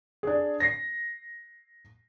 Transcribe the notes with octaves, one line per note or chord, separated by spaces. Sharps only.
D4 G#4
A#6 C7